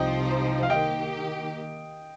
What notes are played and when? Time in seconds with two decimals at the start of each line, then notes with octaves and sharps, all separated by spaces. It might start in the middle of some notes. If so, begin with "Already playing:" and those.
Already playing: C2 C3 F3 D#4 C5 D#5 G5
0.63 F5
0.70 D#3 A#3 G4 D#5 G5